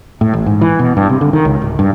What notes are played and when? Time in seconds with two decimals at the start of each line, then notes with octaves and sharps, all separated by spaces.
0.21 A2
0.33 A1
0.46 G#2
0.61 E3
0.79 B2
0.97 G2
1.09 C3
1.21 D3
1.33 D#3
1.45 C#2
1.62 D1
1.79 G2